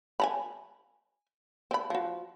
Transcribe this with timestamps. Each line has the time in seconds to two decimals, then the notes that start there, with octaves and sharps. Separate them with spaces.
0.20 G#5 A#5 B5
1.71 C4 B5
1.90 F3 F#4